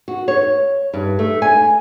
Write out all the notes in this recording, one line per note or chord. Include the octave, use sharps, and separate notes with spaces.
F#4
C#5
G2
A3
G#5